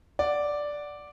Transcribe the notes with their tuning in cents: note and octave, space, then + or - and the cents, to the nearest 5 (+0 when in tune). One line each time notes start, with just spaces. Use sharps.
D5 +0 F#5 +0